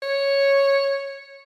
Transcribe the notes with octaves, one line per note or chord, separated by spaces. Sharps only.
C#5